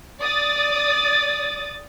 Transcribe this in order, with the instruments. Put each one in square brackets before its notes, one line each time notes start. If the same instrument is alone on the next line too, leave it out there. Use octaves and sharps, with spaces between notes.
[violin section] D5 D#6 A6